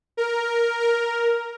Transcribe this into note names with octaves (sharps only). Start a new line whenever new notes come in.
A#4
A#4